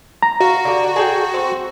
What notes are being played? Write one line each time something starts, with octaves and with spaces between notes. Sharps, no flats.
A#5
F#4 F5
D3 G4
G#4 A4 G5
C4